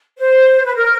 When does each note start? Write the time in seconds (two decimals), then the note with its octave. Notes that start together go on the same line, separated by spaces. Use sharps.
0.18 C5
0.65 B4
0.76 A#4